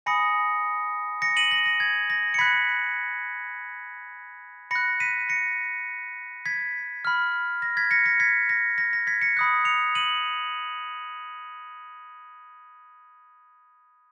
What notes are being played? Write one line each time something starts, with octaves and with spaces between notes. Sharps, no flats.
G#5 B5 D#6 A#6 C#7
A#6 C#7
D#7 F#7
A#6
A#6
G#6
A#6
C#7
B5 F#6 G#6 B6
B5 F#6 A#6 C#7
B6 D#7
A#6 C#7
G#6 B6
B5 F6
A#6
G#6 B6
A#6 C#7
A#6 C#7
G#6 B6
A#6
A#6
A#6
G#6 B6
A#6 C#7
B5 D#6 F#6
C#7 F7
D#7 F#7